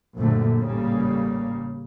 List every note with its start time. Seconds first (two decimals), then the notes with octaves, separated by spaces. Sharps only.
0.17 A#1 F#2 A#2 D3 A3
0.60 A1 C#3 G3 A#3